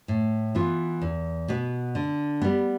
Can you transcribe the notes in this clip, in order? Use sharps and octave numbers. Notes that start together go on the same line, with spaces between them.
A2
E3 B3 F4
E2
B2 B3
D3
G3 B3